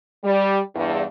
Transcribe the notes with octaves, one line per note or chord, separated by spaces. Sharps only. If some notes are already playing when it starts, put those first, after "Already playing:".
G3
E2 G2